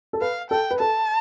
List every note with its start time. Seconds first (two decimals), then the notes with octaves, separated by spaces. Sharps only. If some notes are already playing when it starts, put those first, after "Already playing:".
0.13 A4
0.21 B4 F5
0.51 A4 G5
0.71 B4
0.80 A4 A5